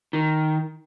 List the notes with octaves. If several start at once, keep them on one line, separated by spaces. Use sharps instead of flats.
D#3